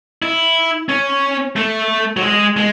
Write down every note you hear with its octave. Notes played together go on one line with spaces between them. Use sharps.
E4
C#4
A3
F#3
G#3
G#3